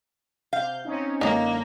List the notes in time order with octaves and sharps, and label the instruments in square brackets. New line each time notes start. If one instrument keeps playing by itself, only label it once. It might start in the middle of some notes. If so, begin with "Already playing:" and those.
[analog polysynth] C3 G6 [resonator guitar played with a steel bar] F5
[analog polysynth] C4 C#4 D#4
[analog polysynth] F#2 D3 [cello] A#3 [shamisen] C#4 D#4